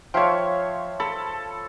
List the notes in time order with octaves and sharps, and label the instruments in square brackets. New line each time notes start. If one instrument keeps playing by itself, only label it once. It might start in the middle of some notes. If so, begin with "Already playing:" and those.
[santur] F3 C#5 [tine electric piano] E5 F5 G5
[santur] A4 [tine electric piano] B5